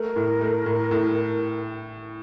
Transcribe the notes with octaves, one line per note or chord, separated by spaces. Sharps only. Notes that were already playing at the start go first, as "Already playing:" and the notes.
Already playing: A3 A#4
A2
A3
A2
A2